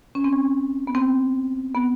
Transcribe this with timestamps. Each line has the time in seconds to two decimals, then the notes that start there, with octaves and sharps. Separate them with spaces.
0.15 C#4
0.24 C4
0.33 C#4
0.87 B3
0.95 C4
1.75 B3